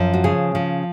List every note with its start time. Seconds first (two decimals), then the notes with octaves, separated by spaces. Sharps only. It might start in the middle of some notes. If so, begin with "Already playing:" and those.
Already playing: F#2 F3
0.14 F#4
0.24 C#3 G#4
0.55 F3